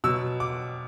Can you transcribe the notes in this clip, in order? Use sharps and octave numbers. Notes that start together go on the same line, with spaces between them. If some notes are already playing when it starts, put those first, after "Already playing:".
B2 F#3 E6
D6